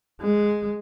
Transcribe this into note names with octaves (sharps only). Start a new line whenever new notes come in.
G#3